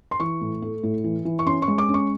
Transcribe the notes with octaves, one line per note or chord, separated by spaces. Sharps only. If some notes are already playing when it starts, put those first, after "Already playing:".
C6
E3 C#6
A2
A3
A2
E3
E3
C#6
C#4 C6
C#6
G#3
D6
C#4
C#6